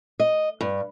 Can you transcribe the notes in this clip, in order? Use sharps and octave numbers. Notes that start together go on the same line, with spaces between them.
D#5
G2